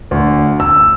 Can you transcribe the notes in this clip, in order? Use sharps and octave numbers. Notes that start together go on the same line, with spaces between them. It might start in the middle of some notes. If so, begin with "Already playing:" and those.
D2
E6